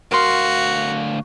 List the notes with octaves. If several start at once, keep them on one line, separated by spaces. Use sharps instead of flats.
D2 F#4 A#4 F5 C6